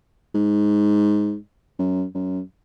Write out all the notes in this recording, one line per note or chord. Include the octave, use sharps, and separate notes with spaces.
G#2
F#2
F#2